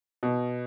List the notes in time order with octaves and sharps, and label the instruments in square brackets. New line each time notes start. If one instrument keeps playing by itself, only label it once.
[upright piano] B2